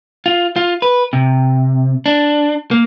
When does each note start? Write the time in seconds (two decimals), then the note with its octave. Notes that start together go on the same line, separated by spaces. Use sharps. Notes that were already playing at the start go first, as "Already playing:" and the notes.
0.26 F4
0.56 F4
0.82 B4
1.13 C3
2.06 D4
2.71 A#3